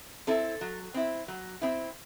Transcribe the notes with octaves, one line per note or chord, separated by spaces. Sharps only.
C4 E4 A4
F#3
C4 E4
F#3
C4 E4